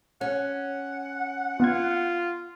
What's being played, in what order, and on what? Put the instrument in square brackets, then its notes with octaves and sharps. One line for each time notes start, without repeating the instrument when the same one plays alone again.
[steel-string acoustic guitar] C#4 [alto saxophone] F#5
[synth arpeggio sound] B3 G#6 [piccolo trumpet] F4